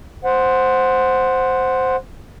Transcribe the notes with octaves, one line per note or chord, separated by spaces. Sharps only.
C5 F#5